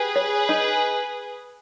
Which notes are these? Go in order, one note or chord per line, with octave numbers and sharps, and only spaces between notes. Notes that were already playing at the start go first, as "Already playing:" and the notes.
Already playing: G4 G#4 B4
C#5
D#4